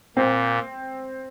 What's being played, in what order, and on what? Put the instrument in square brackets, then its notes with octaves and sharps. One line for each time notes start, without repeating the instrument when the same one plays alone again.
[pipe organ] A#2 [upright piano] C4